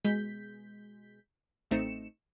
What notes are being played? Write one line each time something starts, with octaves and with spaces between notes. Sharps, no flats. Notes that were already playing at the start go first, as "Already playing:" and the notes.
B2 G#3 G6 B6
A1 A3 C4 D#4 C#7 E7